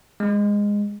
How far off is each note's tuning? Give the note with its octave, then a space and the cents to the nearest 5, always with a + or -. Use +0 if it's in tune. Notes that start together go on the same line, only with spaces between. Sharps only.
G#3 -15